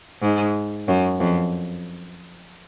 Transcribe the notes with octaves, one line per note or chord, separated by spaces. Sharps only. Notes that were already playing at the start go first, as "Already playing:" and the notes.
G#2
F#2
F2